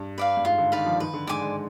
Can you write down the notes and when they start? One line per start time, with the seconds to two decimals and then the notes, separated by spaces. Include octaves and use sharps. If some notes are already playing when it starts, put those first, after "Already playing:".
Already playing: G2
0.18 B4 D5 F5
0.37 G2
0.45 G#2 F4
0.58 D3
0.72 D#3 B4 D5 F5
0.86 F3
1.00 D#3 B4
1.14 D3
1.27 G#2 D5 G#5 D6
1.42 G#2